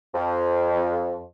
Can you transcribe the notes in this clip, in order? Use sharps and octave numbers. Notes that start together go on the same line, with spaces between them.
F2